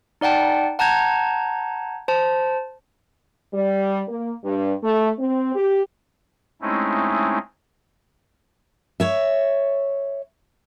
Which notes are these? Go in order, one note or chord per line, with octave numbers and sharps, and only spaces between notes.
D#4 D5 F#5 G5 A5
F#5 A5 A#5 G6 G#6
C5 A5
G3
A#3
G2
A3
C4
G4
G#3 A3 C4 C#4 D#4 E4
C#5 E5